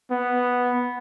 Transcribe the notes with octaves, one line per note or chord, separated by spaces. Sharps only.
B3